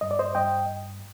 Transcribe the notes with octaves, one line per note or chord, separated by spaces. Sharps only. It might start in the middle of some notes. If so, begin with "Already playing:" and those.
G2 D#5
D5
C5 D#5
G2 D#5 G5